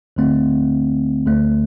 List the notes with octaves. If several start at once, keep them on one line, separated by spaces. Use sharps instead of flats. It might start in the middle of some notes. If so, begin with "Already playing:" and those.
D2 D3 A3 C4
D2 D3 A3